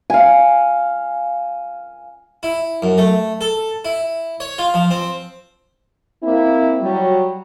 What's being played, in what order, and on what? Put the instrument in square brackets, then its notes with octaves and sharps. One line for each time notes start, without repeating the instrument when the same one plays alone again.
[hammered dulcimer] F5 G#5
[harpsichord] E4
F#2
A3
A4
E4
C#5
F4
F3
C4
[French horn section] A#3 C4 E4
F#3 G3